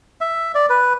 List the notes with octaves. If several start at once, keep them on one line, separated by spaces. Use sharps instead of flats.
E5
D5
B4